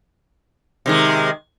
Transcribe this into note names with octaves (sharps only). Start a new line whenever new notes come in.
C3 D#3 G#3